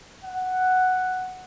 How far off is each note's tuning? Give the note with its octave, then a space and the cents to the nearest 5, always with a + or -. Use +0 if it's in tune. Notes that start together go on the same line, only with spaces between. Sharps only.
F#5 +0